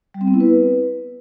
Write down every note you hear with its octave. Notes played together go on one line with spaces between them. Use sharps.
G3
C4
B3
E4
B4